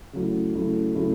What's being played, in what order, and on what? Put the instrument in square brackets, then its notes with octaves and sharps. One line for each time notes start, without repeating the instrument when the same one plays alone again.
[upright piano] C#3 F#3 A3 E4
C#3 F#3 A3 E4
C#3 F#3 A3 E4